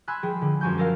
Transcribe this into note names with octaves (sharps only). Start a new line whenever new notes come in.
G#5 B5 C6 E6 F#6 G#6
F3 G#4 G5
D3
F#2 F3 G#5 C#6 G6
A4 A#4 F5